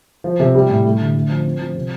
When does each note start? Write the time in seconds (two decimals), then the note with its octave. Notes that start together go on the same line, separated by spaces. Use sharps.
0.24 F3
0.40 C3
0.55 G3
0.69 A2
0.84 A3
1.00 D3
1.15 A3
1.29 F3
1.45 C4
1.60 F3
1.75 C3